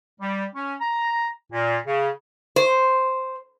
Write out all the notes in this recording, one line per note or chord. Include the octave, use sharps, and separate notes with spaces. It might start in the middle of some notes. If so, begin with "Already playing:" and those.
G3
C#4
A#5
A#2
C#3
C5